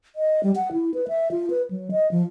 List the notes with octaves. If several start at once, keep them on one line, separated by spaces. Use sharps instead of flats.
D#5
G3
F#5
E4
B4
E5
F4
B4
F#3
D#5
F3